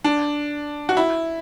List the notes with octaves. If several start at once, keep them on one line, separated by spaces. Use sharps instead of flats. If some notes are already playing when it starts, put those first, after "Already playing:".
D4
F#4
E4